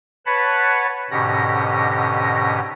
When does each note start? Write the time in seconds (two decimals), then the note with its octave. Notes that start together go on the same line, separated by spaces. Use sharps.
0.26 B4 C#5 F#5 A5 B5
1.11 G#2 B2 D3 C#4 G4 A#6